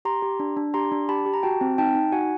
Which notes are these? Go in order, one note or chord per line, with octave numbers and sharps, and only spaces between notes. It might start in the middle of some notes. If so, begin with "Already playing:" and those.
G4 A#5 C6
G4
D4
D4
G4 A#5 C6
D4
G4 A5 B5
G4
A#5
F#4 G5 A5
C4
D#4 G5 A5
D#4
F#4 F#5 G#5